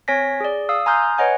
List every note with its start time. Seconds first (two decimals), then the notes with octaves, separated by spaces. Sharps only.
0.08 C4 C#5 G#5 A#6 B6
0.40 G#4 D5
0.69 F5 D#6 E6
0.86 G#5 A#5 C6 D#6 F6 G6
1.18 B4 C#5 D#5 F#5 G#5